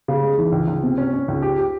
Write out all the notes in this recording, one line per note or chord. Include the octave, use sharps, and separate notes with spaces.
C#3
G#3
E3
C#2
C#2
C3
C#4
C#4
C#2
G4
G4